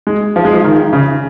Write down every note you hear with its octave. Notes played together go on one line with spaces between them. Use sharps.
G#3
F3
G#3
F3
D#3
C#3